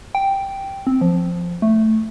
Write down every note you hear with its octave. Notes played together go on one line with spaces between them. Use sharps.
G5
C4
F3
A3